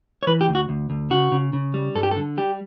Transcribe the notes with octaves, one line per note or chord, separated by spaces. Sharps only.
C#5
E3 B4
G4
D2
F#4
D2
D2
C#3 F#4
C#3
C#3
G3
G2 A4
G4
A4
D3
G3 G4